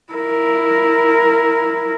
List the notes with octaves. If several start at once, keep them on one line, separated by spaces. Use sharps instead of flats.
E4 A#4